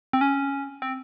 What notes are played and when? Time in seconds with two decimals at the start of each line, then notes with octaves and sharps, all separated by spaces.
0.13 C4
0.21 C#4
0.82 C4